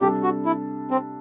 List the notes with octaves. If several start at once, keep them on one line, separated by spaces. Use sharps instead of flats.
C3 G3 D4 G4 A4
F#4
E4
C4